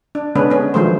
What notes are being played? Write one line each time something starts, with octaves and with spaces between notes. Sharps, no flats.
D4
D3 G#3 B3 C#4 D4 B4
B3 C#4
D#3 F3 F#3 G#3 A3 C5